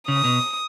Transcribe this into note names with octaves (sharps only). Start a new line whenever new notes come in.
C#3 D#6
B2